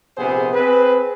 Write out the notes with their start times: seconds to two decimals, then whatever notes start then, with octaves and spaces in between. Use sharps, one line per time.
0.17 A#1 C3 B3 G#4 C5
0.53 C4 G#4 B4